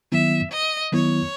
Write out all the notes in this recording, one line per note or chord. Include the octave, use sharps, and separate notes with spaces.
D#3 F#3 B3 E4 E5
D#5
D#3 F#3 B3 E4 C#5